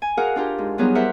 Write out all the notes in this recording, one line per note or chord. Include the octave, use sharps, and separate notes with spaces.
G#5
F#4 G#4 A#4 F5 F#5
D4 F4 G4 A#4
G#2
F#3 G3 B3 D#4 F4 G#4
E4 G4 A#4 C5 E5 F#5